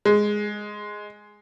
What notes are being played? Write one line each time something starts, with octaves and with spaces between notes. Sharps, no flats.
G#3